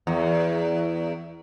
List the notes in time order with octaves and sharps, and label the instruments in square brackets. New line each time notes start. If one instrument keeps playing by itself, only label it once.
[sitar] E2